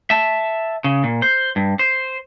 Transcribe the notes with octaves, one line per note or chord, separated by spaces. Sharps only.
E5 A5
C#3
A#2
C5
G2
C5